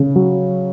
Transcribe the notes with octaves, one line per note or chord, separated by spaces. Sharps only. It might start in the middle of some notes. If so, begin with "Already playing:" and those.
Already playing: C#3
F#3